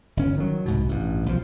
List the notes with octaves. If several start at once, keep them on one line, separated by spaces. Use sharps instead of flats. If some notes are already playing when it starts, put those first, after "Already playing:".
G1 C#4
D#3 F#3
C2 G#2 B2
A1 G2
B1 F3